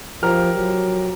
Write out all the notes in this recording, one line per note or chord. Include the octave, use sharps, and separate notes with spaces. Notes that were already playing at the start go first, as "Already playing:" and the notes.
F3 G4 A#4 F6
F#3